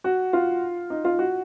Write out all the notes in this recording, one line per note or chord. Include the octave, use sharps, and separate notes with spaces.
F#4
F4
D#4
F4
F#4